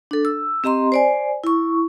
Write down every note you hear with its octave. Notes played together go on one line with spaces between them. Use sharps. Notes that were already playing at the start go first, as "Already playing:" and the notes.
D4 A4
E6
C4 G4 D#5 A#5 C6
C5 D5 G#5
E4 C#6